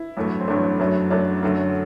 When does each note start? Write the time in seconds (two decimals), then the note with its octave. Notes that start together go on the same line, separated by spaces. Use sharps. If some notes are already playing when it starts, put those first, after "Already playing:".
Already playing: E4
0.17 A1 G2 F#3 A3
0.40 C4
0.48 A1 G2 F#3 A3 D4
0.79 F#2 F#3 A3
1.10 F#2 F#3 A3 D4
1.42 F#2 D3 F#3 A3